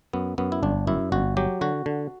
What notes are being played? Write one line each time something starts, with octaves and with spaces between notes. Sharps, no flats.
F#2 B3
F#2 B3
E4
G1 D4
F#2 E4
G1 F#4
F#3 G4
D3 F#4
D3